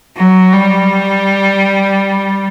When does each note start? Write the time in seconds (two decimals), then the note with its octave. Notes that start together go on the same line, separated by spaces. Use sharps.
0.16 F#3
0.53 G3